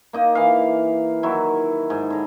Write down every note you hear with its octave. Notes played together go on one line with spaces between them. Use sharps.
A#3 D#4 D#5
E3 F5
D#3 F#3 E4
G#2
D3 A#5